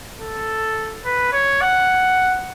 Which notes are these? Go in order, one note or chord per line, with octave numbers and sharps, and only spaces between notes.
A4
B4
C#5
F#5